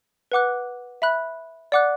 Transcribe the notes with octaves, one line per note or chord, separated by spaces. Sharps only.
B4 F#5 D6 F#6
E5 B5 F#6
D5 F#5 D6 F#6